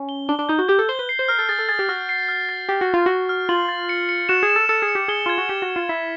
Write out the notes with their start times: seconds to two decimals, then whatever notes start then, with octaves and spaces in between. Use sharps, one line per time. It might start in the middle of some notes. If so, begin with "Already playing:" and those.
Already playing: C#4
0.09 G7
0.29 D4 G7
0.39 D4
0.49 D#4 G6
0.59 F#4
0.68 G4 G6
0.79 A4
0.89 C5 G7
0.99 B4
1.09 C7
1.19 C5
1.28 A#4 F6
1.39 A4
1.49 G#4 A6
1.59 A4
1.69 G#4 A6
1.79 G4
1.89 F#4 F6
2.09 C7
2.29 F6
2.49 A6
2.69 G4 A6
2.81 F#4
2.89 F4 A6
3.06 F#4 F6
3.29 F6
3.49 F4 F#7
3.69 A6
3.89 C#7
4.09 C#7
4.29 F#4 E7
4.43 G#4
4.49 E7
4.56 A4
4.69 A4 C#7
4.82 G#4
4.89 C#7
4.95 G4
5.08 G#4 G7
5.26 F4 G#6
5.38 F#4
5.49 G4 E7
5.62 F#4
5.69 E7
5.76 F4
5.89 E4 B6